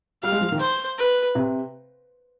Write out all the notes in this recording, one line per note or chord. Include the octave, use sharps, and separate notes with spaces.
G3 F5
G#3
F3
D#3
C5
B4
C3